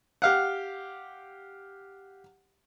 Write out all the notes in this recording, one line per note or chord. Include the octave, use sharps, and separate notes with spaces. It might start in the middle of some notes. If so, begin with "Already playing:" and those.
G4 F5 F#5